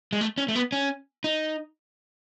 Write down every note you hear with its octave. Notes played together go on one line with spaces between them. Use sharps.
G#3
A3
C#4
A3
B3
C#4
D#4